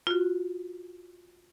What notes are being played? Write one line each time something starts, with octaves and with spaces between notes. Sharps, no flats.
F4 F#4